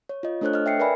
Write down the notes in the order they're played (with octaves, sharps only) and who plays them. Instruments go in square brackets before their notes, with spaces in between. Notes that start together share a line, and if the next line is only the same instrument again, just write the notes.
[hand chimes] C#5
F4 D#5
A3 D4 A4 C5 C#5 F#6
D#5 F6
E5 G5 C7 C#7
A#4 B4 D5 E5 G#5 B5